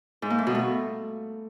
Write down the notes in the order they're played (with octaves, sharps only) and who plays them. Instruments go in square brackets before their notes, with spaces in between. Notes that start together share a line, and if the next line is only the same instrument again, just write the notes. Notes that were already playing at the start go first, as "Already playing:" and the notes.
[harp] G#2
A#3
A3
B2
A3